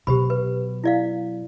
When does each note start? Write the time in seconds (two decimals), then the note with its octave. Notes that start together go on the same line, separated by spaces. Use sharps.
0.07 B2 F#3 G4 C5 B5
0.30 B4
0.84 E4 D5 F5